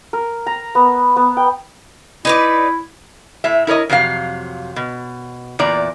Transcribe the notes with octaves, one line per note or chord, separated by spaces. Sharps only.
A#4
A#5
B3
B3
G5
D#4 E4 B4 D5
A2 E5
E4 A#4 C#5 D#5
F2 C3 F#3 F5
B2
E2 A#2 D5 A#5